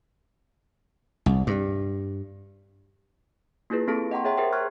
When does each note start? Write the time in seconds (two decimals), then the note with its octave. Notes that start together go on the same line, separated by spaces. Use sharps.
1.26 C2
1.47 G2
3.70 A#3 E4 F4 G#4 B4
3.88 A#3 C4 G4 A4 A5 D7
4.11 D#5 F#5 G5 A#5 C6 C#6
4.24 G#4 C#5 E5 G5 A#5 C6
4.37 G4 G#4 A#4 C5 E5 G5
4.52 G5 A#5 C#6 F6 F#6 G#6